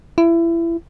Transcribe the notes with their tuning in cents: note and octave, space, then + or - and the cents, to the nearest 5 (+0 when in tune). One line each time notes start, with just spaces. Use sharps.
E4 +25